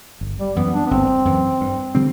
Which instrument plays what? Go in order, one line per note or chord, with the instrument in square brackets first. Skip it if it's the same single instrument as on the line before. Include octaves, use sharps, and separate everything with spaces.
[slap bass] G1
[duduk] G3
[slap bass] F#2 E3 [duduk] B3
[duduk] D4
B3
[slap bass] G1 [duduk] C4
[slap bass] F#2 E3
G2
D3 G3 C4